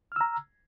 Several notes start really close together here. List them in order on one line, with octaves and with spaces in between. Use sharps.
F6 E6 A#5